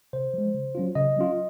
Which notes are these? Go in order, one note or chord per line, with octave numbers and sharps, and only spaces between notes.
C3 C5
F3 G#3
C#3
F#3 C#4 F4
C#3 D#5
F#3 C#4 F4